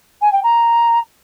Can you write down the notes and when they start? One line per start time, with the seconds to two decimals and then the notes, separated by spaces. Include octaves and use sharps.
0.21 G#5
0.32 G5
0.43 A#5